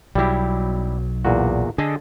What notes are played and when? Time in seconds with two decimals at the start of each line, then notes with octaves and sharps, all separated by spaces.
0.15 B1 F#3 G3 E4 G4
1.25 E2 A#2 F#4
1.78 D3 G#4 A4 D#5